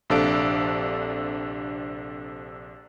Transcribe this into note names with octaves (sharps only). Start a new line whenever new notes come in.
A#1 C3 D4 A4 F5 D7